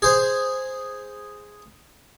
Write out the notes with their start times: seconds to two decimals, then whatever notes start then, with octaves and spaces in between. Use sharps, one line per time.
0.02 G#4 C5